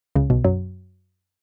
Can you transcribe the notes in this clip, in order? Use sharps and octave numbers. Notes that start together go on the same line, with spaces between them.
C#2 C#3
B1 B2
F#2 F#3